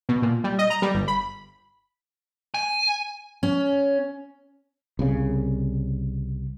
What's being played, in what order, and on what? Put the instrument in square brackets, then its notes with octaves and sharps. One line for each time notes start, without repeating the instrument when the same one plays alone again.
[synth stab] B2
A#2
G3
D#5
A#5
G3
G1
B5
[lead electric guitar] G#5
[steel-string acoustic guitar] C#4
[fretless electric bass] C2 C#3